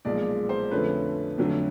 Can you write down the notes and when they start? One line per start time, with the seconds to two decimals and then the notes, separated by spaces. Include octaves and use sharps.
0.05 B1 A#2 F3 G#3 D5
0.49 C5
0.71 F2 D3 F3 A3 C#4 B4
1.38 F2 D3 F#3 A3